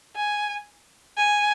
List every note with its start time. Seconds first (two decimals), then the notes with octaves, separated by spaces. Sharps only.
0.16 G#5
1.17 G#5